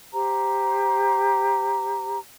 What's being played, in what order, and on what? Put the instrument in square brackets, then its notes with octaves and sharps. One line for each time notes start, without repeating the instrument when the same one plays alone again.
[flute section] G4 C5 A#5